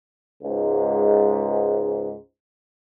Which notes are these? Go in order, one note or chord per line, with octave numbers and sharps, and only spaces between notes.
C#2 G#2